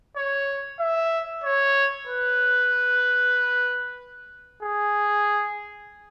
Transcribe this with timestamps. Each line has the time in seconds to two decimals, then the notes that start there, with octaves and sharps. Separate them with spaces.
0.16 C#5
0.79 E5
1.44 C#5
2.07 B4
4.62 G#4